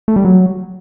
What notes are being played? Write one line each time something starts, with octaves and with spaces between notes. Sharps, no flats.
A3
G3
F#3